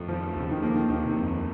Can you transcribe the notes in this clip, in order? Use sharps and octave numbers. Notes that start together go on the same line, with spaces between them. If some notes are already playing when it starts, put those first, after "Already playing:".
Already playing: F2 A3
D#3 F3
D#2 C#3
D#3
F3 A#3
D#3
D#2 D#3
C3
F2